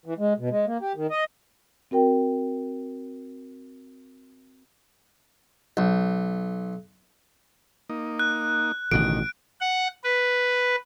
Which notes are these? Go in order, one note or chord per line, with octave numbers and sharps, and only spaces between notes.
E3
G#3
B2
G#3
A#3
G4
D#3
D#5
C4 F#4 A#4 G5
B1
A#3 D#4
F#6
A1 B2 D3 D#3 D7
F#5
B4